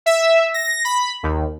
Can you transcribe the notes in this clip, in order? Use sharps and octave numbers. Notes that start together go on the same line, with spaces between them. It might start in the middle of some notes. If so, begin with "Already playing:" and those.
E5
A#6
B5
D#2